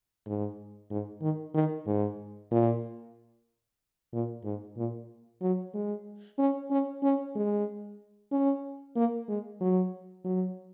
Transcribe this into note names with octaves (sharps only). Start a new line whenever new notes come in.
G#2
G#2
D#3
D#3
G#2
A#2
A#2
G#2
A#2
F#3
G#3
C#4
C#4
C#4
G#3
C#4
A#3
G#3
F#3
F#3